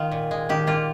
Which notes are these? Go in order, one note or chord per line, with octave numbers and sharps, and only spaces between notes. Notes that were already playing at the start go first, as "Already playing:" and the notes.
Already playing: D#3 F4
A#2
G#3
D#3 G4
A#3 F4